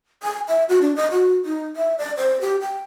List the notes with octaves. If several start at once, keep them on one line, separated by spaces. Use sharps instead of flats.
G#5
E5
F#4
D4
D#5
F#4
D#4
E5
D5
C5
G4
G5